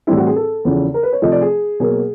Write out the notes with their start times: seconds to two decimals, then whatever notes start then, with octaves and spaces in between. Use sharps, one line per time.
0.07 A2 E3 G3 C4 E4
0.17 F#4
0.26 G#4
0.36 A4
0.65 E2 C#3 F3
0.94 A#4
1.03 B4
1.13 C#5
1.22 C3 F3 A3 D#5
1.32 D5
1.41 G#4
1.80 B2 F#3 A#3 G#4